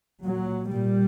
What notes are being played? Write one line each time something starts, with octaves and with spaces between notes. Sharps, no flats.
A#2 F#3
A#2 G3